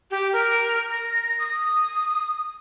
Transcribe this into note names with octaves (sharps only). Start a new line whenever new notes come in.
G4
A#4
A#6
D#6